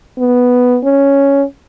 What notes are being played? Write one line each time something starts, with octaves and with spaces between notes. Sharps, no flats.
B3
C#4